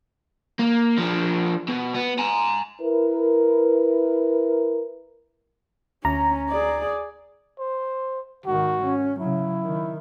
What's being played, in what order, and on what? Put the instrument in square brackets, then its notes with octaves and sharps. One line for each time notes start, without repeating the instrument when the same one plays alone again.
[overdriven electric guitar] A#3
F3 D4
B2
B3
G#5 A#5
[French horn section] E4 A#4 B4
[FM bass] D2 [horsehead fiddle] C#4 [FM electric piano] A#5
[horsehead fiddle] G#4 D5
[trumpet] C5
[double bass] G#1 D#3 [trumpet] F#4
[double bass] C#4
[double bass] C#3 F#3 [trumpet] E4
[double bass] D#3